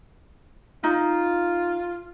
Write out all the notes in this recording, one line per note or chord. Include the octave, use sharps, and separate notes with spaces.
D#4 F4